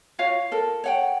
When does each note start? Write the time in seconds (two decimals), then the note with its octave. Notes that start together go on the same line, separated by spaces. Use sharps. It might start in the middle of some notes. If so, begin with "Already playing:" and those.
0.19 F4 F#4 C#5 F5
0.52 A4 A#4
0.84 C#5 F#5 G5